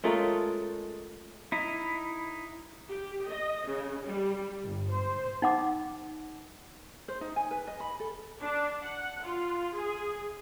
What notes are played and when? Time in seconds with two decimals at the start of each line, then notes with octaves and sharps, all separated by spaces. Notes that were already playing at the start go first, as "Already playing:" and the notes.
0.04 G#3 A3 C#4 F4 A#4
1.52 D#4 E4
2.89 G4
3.27 D#5
3.66 C#3
4.03 G3
4.63 G1
4.93 C5
5.42 D#4 F#5 D6
7.08 C5
7.21 D#4
7.36 G#5
7.51 B4
7.67 D#5
7.80 B5
8.00 A4
8.40 D4
8.82 F#5
9.23 F4
9.74 G#4